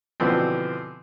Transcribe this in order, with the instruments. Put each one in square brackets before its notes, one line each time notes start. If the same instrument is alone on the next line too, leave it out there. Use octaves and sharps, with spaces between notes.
[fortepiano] B2 D3 E3 F3 B3 C4